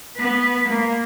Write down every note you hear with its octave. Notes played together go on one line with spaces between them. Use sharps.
B3 B4
A#3